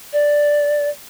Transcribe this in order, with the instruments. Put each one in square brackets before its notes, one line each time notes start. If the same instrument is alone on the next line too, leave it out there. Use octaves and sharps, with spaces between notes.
[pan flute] D5